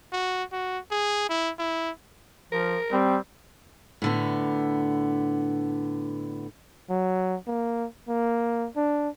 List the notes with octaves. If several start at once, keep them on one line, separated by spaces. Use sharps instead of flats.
F#4
F#4
G#4
E4
E4
F3 A#4
G3 C4
A2 D3 B3
F#3
A#3
A#3
D4